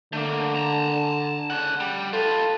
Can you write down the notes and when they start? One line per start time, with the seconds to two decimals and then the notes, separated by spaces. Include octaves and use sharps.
0.13 D3 A3 A#3
0.55 A5 A#5
1.50 C#3 F#5
1.80 G3
2.13 F4 A4 B4